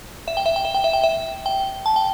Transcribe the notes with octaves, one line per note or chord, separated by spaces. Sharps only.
E5
G5
E5
G5
E5
G5
E5
G5
E5
G5
A5
G5